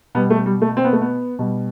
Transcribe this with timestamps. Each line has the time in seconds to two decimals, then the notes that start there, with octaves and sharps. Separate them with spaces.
0.15 B2 G3 B3
0.30 A3
0.46 G3
0.62 A3
0.77 C4
0.84 B3
0.93 A3
1.01 B3
1.39 B2 G3